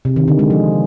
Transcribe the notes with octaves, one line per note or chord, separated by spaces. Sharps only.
C3
D#3
D3
G#3
F3